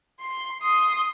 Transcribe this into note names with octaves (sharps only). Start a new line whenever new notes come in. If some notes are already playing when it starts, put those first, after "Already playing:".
C6
C6 D#6